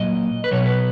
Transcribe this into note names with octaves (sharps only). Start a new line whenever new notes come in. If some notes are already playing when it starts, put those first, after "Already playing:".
Already playing: A#2 F#3 D#5
B4
B2 F#3 C#5
B4